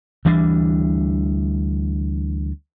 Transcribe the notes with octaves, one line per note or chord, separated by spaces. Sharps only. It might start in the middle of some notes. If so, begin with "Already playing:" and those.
D2 E3 G3 D4